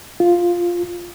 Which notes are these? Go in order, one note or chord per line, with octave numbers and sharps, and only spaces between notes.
F4